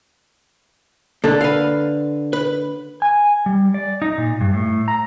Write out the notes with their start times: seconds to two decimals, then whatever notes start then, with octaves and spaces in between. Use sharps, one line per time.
1.24 D3 A#3 A4
1.41 B4 F5
2.33 B4
3.02 G#5
3.46 G3
3.74 D5
4.02 D#4
4.18 A#2
4.41 G2
4.53 A2
4.88 A#5